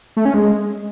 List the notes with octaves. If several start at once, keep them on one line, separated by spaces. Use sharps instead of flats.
A3
C#4
G#3